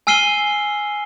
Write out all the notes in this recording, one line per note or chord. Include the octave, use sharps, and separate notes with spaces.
G#5 E6 F6 C7 D#7 G7